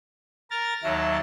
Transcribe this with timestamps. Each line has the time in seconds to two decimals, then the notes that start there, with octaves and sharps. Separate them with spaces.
0.51 A#4 A#5 A6
0.83 D#2 F#3 E5 A5